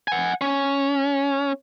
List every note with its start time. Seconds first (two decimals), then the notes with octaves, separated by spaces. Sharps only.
0.08 F#5 G#5
0.41 C#4